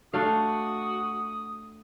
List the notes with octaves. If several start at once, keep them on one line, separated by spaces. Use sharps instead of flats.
A3 D4 F#4 F5 D#6